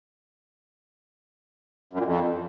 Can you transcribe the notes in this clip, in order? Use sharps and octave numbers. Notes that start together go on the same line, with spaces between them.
F#2
A#2
F2